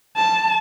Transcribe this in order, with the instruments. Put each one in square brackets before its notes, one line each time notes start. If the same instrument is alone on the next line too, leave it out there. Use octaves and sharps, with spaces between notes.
[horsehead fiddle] A5